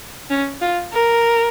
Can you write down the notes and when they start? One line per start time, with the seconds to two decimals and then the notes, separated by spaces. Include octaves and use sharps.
0.30 C#4
0.62 F4
0.93 A#4